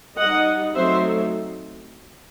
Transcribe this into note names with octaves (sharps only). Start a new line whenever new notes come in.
G3 D#4 D#5 F#5
F#3 A3 C4 D#4 C5 E5